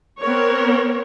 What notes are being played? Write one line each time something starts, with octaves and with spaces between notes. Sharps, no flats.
B3 C4 A#4 C#5